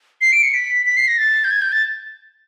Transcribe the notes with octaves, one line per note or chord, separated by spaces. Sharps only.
C7
D7
C#7
B6
B6
C7
A#6
A6
G6
G#6
G6
A6